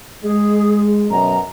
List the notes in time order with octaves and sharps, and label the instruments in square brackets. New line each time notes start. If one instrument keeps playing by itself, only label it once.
[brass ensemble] G#3 [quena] G#4
[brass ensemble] F#2 B2 [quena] A#5